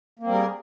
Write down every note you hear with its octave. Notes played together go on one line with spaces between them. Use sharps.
G3 A#3 C4 G#4 A#4